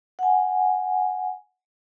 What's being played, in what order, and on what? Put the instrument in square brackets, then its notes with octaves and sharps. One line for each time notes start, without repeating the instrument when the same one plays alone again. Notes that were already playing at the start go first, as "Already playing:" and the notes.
[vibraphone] F#5 G#5